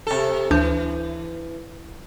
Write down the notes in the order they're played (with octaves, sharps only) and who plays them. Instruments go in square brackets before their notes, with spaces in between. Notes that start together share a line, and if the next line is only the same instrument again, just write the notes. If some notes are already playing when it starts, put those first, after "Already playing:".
[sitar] C3 A4
[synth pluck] D2 D4 G6 [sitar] E3